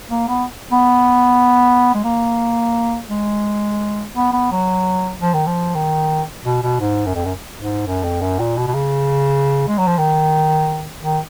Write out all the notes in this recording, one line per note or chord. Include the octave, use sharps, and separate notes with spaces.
A#3
B3
B3
G#3
A#3
G#3
B3
B3
F#3
F3
D#3
F3
D#3
B2
B2
G#2
F#2
F2
F#2
G#2
F#2
F2
F#2
A#2
B2
B2
C#3
G#3
F#3
F3
D#3
D#3